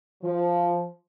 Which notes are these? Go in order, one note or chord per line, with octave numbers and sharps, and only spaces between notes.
F3